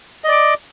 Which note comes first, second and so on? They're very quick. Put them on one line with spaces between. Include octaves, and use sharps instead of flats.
D#5 D5 D6